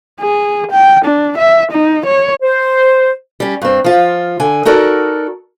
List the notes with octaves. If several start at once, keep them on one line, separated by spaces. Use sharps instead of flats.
G#4
G5
D4
E5
D#4
C#5
C5
G3 C#4
G2 C4
F3 F4
D3 G#5
D#4 F#4 A4 A#4 D5